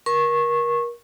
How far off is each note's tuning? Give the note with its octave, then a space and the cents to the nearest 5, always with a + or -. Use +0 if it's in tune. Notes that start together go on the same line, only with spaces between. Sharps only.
A#4 +30 C#6 -20